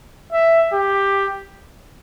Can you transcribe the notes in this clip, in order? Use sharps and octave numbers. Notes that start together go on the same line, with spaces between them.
E5
G4